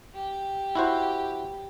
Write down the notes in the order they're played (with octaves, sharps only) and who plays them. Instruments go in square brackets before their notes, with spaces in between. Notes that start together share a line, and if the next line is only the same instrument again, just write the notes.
[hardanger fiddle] G4
[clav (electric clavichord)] E4 F#4 C5